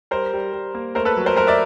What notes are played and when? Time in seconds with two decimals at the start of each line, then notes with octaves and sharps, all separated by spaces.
0.11 G3 A#4 C5
0.33 G3
0.53 G3
0.75 A#3
0.95 A3 A#4 C5
1.05 A4 B4
1.17 F#3
1.26 A#4 C5
1.37 F#3 A#4 C5
1.47 D5 E5